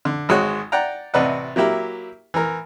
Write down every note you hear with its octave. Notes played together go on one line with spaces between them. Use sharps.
D3
G#1 G#3 F#4 C#5 F#6
D5 F#5 G5 A#5
A1 C3 B4 D5 D#5 F#5
F#3 A#3 E4 G4 E5
E3 A#4